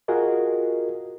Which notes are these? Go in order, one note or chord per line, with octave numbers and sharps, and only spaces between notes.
F4 F#4 G#4 A#4 D#5